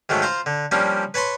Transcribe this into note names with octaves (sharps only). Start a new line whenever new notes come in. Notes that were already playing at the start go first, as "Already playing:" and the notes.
G#2 D#3 F#3 A3
F4 C5 A#5
D3
F3 G3 A#3 C#4 D4
B4 C#5 A5 B5 C6